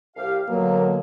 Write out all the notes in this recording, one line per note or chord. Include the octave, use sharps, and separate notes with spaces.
C2 G4 F5
B2 D3 F#3 A#3